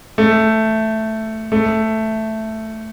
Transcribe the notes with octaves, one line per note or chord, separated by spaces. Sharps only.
A3
A3